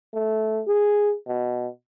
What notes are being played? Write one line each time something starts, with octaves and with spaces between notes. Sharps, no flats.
A3
G#4
B2